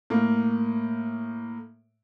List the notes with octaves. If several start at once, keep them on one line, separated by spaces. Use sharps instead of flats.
A2 A#3